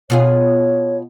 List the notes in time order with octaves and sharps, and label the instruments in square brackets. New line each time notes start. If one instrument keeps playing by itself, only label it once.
[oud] B2 F4 G#4 [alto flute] C#5